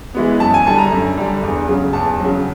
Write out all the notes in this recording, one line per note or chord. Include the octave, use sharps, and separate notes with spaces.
E3 G#3 B3
F#2 A5
G#5
D3 G3 A5
A#5
F#2
D3 G3
E2
C#3 F#3
E2 A5
C#3 F#3